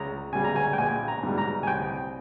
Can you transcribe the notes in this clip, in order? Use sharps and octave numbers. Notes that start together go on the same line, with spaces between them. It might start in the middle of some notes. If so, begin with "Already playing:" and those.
Already playing: C#2 A#5
C#3 G3 G#5
A#5
G#5
G5
A#1 G#5
A#5
G#2 G3
A#5
G#5
C2 G5